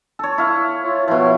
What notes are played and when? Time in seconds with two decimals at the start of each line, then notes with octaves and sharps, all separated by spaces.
0.19 A4 C#5
0.38 E4 F5 C#6
0.84 F4 C#5
1.08 B2 F3 E4 C#5 F5